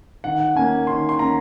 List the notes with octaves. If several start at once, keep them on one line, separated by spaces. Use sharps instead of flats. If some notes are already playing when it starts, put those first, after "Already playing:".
D#3 F#5
F#5
A#3 C#4 G#5
D#3 C6
C6
A#3 C#4 A#5